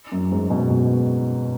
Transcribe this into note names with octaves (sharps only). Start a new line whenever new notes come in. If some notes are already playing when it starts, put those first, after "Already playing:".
F#2
G#2
B2
B2